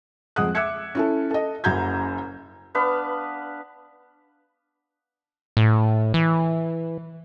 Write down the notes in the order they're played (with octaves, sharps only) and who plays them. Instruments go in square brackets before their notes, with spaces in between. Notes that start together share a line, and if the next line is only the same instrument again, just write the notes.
[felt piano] F2 G#3 F#5 D#6 F#6
E5 D6 E6 F#6 G#6 C#7
C#4 E4 A4
A4 D#5
F#1 F#2 F#3 A#5 G6 G#6
[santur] B3 D4 B4 F5
[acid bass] A2
E3